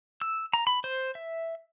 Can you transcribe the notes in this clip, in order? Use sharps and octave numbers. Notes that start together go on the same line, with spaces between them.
E6
A#5
B5
C5
E5